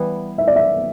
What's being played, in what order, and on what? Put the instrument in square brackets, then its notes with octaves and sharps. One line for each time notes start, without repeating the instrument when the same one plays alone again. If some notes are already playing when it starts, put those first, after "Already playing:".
Already playing: [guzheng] E3 G3 B3
[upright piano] E5
D5
E5